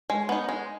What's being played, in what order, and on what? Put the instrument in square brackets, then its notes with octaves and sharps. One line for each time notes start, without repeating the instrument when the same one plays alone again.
[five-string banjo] G#3
B3 D#4
G#3